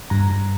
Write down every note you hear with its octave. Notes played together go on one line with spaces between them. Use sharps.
G2 A#5